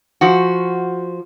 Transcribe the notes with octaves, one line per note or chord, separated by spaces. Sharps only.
F3 F#4